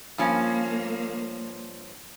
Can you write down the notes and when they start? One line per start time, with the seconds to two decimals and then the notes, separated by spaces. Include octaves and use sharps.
0.18 G2 F3 A#3 C#4